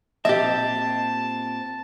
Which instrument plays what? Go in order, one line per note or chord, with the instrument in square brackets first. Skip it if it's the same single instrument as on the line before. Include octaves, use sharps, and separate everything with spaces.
[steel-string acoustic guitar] A#2 C4 [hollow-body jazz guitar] G4 E5 [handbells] D#5 [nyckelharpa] A5